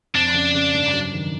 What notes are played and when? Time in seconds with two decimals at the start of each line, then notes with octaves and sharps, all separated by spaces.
0.14 F2 D4
0.34 C#3
0.54 C#3
0.74 G2
0.93 F#3
1.13 D#3